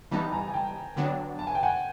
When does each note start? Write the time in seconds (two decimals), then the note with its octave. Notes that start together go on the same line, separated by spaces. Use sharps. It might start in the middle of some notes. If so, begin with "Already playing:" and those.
0.11 E3 G3 B3 D#4 A5 B5
0.23 B5
0.33 G#5 A#5
0.48 G#5
0.54 G5 A5
0.96 D3 F#3 B3 D4
1.39 A5
1.47 G#5
1.55 G5
1.63 F#5 G#5